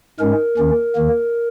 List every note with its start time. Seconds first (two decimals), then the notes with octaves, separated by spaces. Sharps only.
0.19 G#2 G#3 C#4 A#4
0.58 D#2 D#3 C#4
0.95 D#2 D#3 A#3